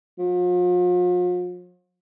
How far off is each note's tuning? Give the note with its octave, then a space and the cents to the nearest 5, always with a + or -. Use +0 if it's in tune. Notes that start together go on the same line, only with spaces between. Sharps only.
F3 +40